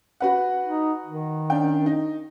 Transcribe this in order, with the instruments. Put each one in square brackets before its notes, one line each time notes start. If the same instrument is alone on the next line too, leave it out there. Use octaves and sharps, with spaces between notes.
[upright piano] F#4 B4 F#5
[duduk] D#4
D#3
[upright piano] C#4 D4 G5
D#4